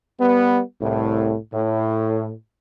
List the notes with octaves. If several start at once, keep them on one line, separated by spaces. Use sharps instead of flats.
G3 B3
C2 A2
A2